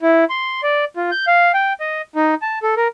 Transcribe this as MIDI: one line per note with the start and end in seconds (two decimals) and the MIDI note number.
0.02 0.25 64
0.30 0.61 84
0.63 0.85 74
0.97 1.11 65
1.11 1.25 91
1.27 1.52 77
1.54 1.73 79
1.80 2.02 75
2.15 2.34 63
2.42 2.59 81
2.63 2.75 69
2.77 2.88 70